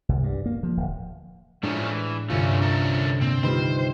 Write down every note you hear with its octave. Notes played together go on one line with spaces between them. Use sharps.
C2
G2
A#3
F3
D1
A2 F3 G#3 A3 C#4 D4
E3
C2 G2 D3 A3 C#4 F4
C#4 A4 A#4
A#2 C4
D#3 G3 D#4 F4 B4 C5